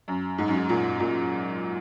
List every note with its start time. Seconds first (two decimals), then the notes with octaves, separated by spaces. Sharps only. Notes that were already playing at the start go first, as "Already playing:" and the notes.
0.08 F#2
0.38 G#2
0.48 F#2
0.56 G#2
0.69 A#2
1.00 A#2